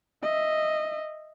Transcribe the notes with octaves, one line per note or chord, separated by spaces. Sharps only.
D#5 E5